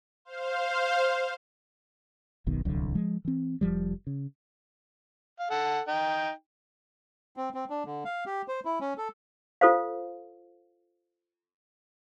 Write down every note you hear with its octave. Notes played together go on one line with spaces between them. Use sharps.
C5 F5
F#1 B1 B2 D#3
D1 C2 D3 F#3
F3 G#3
E3 C4
F1 F3 G3
C#3
F5
A4 F#5
D#4 G5
C4
C4
D4
D3
F5
G4
C5
E4
C#4
A4
F4 A4 C5 F5